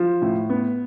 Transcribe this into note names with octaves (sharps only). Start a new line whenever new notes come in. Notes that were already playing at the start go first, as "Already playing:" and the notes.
Already playing: F3
A2
B3